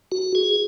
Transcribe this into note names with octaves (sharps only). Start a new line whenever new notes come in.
F#4
G#4